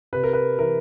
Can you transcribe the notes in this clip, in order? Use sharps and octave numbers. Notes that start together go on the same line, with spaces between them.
C3 B4
A#4
B4
E3 A#4